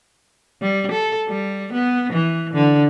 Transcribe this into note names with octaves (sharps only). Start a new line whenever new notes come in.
G3
A4
G3
B3
E3
D3